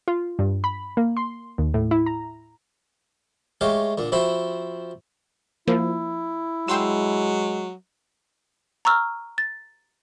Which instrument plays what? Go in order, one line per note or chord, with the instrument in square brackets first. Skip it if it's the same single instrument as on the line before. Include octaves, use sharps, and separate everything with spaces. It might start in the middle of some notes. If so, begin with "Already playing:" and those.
[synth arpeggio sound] F4
G2
B5
A#3
C6
D#2
A2
E4
A#5
[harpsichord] G#3 A3 G4 C#5 F5
A#2 D3
F3 C4 E4 F#4 C5 E5
[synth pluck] F3 A#3 [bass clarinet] E4
[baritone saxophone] F#3 [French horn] G#3 [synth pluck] G5 C6 E6
[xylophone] A#5 C#6 E6 F6
A6